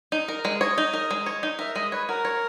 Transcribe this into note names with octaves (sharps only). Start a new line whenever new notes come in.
D#4
A#4
G#3
C#5 D#5
D#4
A#4
G#3
C#5
D#4
A#4 E5
G#3 D#5
B4 C#5
F#4 A#4
C#5